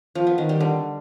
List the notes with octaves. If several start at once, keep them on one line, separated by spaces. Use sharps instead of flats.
F3
B3
D#3
G3
D3